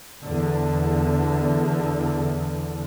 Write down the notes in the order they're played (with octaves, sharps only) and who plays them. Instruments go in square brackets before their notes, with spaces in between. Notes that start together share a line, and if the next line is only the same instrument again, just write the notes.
[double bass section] E2 D3